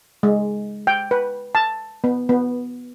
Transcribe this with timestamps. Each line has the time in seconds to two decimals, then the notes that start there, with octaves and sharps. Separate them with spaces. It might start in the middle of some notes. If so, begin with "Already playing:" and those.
0.23 G#3
0.87 G5
1.11 B4
1.55 A5
2.04 B3
2.29 B3